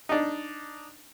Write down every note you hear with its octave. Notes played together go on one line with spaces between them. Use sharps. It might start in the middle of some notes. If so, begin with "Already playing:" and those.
D4 D#4